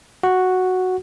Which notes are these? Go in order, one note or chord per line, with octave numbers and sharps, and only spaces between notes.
F#4